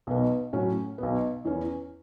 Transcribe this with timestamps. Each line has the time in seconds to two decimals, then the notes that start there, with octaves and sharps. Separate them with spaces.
0.07 B1 B2 B3
0.53 A2 F#3 C#4
0.98 B1 B2 B3
1.45 E2 E3 C#4